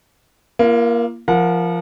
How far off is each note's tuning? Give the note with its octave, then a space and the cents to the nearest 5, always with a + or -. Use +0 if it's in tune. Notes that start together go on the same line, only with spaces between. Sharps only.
A#3 +15 F4 -40
F3 -15 A#4 +5 F#5 -30